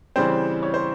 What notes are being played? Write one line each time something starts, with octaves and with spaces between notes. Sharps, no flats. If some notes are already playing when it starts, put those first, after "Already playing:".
C#3 E3 G3 C4 C5
C#5
C5